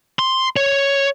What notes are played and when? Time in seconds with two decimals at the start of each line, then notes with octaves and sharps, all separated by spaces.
0.19 C6
0.57 C#5